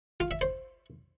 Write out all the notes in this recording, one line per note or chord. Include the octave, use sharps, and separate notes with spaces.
F4
E5
C5